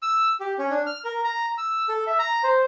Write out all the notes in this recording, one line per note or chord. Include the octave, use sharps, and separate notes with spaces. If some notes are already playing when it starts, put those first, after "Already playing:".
E6
G4
C#4
D4
F6
A#4
A#5
E6
A4
E5
A#5
C5